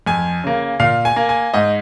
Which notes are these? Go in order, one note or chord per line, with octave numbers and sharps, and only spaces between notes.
F2 G#5
C#3 A#3
A#2 F5
G#5
A#3
G#5
G#2 D#5